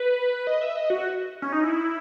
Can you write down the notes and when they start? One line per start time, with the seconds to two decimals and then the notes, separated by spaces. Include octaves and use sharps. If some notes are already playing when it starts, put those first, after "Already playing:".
Already playing: B4
0.47 D#5
0.62 E5
0.76 D#5
0.90 F#4
1.42 C#4
1.52 D#4
1.64 E4